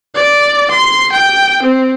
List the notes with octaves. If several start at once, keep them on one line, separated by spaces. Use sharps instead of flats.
D5
C6
G5
C4